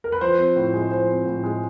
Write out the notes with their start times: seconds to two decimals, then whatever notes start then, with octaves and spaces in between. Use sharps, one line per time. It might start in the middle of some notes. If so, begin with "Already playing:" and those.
0.04 A#4
0.12 B4
0.21 F3 C5
0.38 C4
0.56 A2
0.74 G#3
0.91 F3 C5
1.08 C4
1.26 A2
1.44 G#3